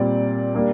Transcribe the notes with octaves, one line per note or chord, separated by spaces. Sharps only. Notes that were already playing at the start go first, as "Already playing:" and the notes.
Already playing: A#2 G3 C4 D5
G3 A#3 D4